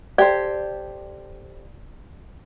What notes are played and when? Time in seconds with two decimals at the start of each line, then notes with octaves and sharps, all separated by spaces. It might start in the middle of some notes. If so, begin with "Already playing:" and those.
0.18 G4 A4 C5 D5